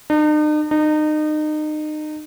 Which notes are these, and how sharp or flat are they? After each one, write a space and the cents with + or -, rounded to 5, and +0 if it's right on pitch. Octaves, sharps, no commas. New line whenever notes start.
D#4 -45
D#4 -30